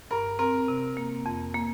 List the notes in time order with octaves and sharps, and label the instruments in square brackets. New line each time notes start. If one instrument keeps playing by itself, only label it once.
[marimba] G2 [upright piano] A#4
[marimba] C4 [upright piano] A#4
[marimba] C3
A#3
F2
A#3